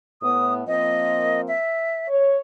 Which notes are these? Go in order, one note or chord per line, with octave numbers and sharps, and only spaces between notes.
A2 B3 D#6
F3 A#3 C4 D#5
E5
C#5